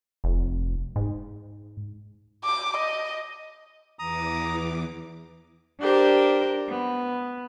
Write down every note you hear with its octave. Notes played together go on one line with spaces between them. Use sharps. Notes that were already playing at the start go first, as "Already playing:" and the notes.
F1
G#2
D6
D#5
E2 E3 A#5 D6 D#6
D4 G4 A#4 C5
B3